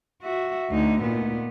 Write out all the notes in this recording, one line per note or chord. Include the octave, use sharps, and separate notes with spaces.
F#4 E5
D2 D#4
A#2 B3